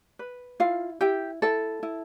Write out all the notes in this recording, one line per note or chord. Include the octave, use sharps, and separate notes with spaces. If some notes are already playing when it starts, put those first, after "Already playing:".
B4
E4 F4 F5
E4 G4 G5
E4 A4 A5
E4